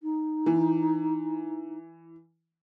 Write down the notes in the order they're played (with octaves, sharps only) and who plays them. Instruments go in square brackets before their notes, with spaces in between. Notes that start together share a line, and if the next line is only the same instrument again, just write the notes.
[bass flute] D#4
[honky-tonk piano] E3